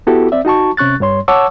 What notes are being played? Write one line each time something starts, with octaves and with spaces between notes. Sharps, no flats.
B3 E4 F#4 G4 A4
C4 D5 E5
D#4 F#4 A5 C#6
C3 C#4 C#6 F#6 A6
G2 G3 C#5 C6
C#5 F#5 A5 C#6 D6 E6